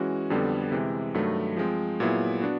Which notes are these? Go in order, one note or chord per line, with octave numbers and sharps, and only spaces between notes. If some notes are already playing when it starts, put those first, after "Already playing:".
Already playing: E3 G#3 C#4 F#4
F2 D3 G3 B3
C3 E3 G#3
G2 D#3 F#3 A3
F3 G#3 C4
A#2 F#3 B3 E4 G#4
B3 D4 F#4